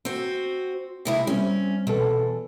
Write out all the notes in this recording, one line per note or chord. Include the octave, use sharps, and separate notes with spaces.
C4 F#4
C3 G#3 E4
G3 C4 C#4
E2 B2 A4